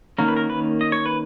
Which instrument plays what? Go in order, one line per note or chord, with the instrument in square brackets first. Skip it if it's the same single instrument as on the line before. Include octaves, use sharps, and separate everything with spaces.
[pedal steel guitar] D#3 A#3 C#4 A#4
B4
A#4
B4
D#5
C#5
B4